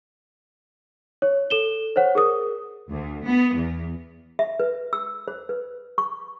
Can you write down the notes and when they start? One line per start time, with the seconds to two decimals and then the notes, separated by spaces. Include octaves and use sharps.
1.22 C#5
1.50 A4 E7 G7
1.96 C5 C#5 F#5
2.15 G#4 A#4 D#6
2.91 D2
3.26 B3
3.55 E2
4.39 E5
4.60 B4
4.93 E6
5.28 C5
5.49 B4
5.98 C#6